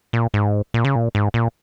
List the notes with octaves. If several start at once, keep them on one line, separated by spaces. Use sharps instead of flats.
A#2
G#2
A#2
C#3
A#2
G#2
A#2